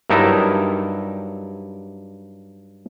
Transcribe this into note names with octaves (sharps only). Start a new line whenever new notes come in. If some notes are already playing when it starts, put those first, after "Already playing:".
G2 F#3 D#4 E4 A#4 A5